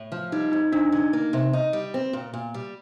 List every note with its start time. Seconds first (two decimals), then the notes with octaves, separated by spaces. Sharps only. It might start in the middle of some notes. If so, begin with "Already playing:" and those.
Already playing: A2
0.12 F3
0.32 G3 D#4
0.52 F2 D#4
0.72 F2 D4
0.92 D3 D#4
1.13 A#3
1.33 C3
1.53 D#4
1.73 G3
1.94 C4
2.13 A#2
2.34 A#2
2.54 G3